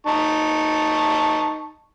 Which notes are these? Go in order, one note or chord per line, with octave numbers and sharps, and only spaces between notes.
D#4 A5 C#6